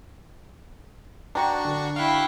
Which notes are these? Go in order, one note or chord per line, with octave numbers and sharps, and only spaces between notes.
D4 F#4 G5 A#5 C#6
D3
E4 F5 G5 C#6 F#6